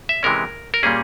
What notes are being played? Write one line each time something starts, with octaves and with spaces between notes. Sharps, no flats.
E5
C3 E3 G#3 C#4 A#4
A#4
A#2 G3 A#3 C#4 G#4